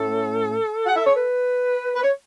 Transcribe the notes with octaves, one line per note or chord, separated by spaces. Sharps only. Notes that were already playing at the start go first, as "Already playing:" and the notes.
Already playing: A2 A3 C#4 A4
F#5
E5
C#5
B4
B4
C#5